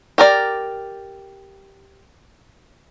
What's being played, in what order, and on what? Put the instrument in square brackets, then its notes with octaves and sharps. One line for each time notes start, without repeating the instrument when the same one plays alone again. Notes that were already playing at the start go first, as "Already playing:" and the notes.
[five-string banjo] G4 A#4 D5